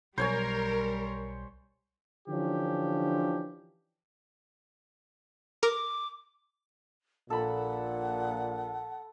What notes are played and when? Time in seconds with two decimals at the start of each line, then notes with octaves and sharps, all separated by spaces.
0.18 B1 G3 A#4 C5 C#5 G#5
2.28 D3 E3 F3 C#4 D4 G4
5.63 A#4 D6
7.30 A#1 A#2 A4 F#5 B5